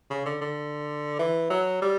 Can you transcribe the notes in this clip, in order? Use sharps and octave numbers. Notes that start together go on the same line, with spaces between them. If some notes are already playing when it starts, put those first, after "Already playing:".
C#3
D3
D3
E3
F#3
G3